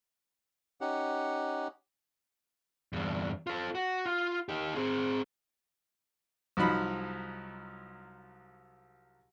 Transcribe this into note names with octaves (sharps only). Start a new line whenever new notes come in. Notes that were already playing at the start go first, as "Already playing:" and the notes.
C#4 D#4 G4 F#5
E2 G2
F4 A4
F#4
F4
D#4 G4
C4 G#4
C2 F3 F#3 D#4 B5